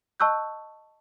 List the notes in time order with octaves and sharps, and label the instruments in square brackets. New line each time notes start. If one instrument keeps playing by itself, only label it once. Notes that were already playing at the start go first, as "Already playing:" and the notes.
[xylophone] D#5 A5 C#6 E6 F#6 G6